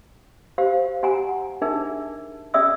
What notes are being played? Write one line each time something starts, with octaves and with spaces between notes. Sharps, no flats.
G4 C5 F5
G4 F#5 G#5 A#5
D4 D#4 G#4 A#4 E5
C#4 G#4 D5 E5 D#6 E6